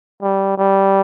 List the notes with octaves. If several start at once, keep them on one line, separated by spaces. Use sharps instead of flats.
G3
G3